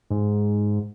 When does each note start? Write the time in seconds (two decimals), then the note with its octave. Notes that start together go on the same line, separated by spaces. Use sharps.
0.10 G#2